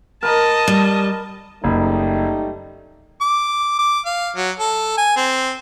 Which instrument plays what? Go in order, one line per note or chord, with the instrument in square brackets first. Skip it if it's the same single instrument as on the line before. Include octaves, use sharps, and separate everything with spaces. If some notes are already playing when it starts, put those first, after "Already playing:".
[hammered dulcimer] A#4 B5 [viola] D#5 A5
[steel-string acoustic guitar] G3
[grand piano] F#1 [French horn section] G3 A3 D#4
[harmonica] D6
D6
F5
F#3
A4
G#5
C4